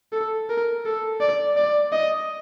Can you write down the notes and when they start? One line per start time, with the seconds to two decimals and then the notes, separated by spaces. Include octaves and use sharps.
0.13 A4
0.50 A#4
0.85 A4
1.21 D5
1.57 D5
1.92 D#5